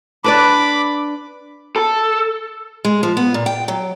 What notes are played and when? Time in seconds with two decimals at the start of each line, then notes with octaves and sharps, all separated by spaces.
0.24 D4 B4 D5 B5 D6
1.76 A4
2.85 G#3
3.03 F3
3.17 B3
3.34 A#2
3.46 G5
3.68 F#3